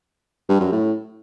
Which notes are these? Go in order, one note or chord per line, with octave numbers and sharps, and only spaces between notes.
G2
F#2
A2